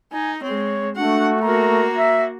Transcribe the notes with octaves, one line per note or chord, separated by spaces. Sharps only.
D#4 G#5
G#3 C4 C#5
A3 D4 F#4 F#5
A#3 F#4 A#4 A#5
E5